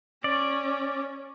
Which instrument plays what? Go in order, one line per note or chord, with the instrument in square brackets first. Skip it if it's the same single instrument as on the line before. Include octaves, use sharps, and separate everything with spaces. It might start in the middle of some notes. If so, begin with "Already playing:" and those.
[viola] C#4 [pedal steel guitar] D5